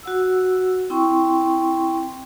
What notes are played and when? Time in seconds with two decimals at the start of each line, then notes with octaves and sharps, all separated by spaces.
0.03 F#4 F#5 E6
0.90 C4 E4 G5 C6 C#6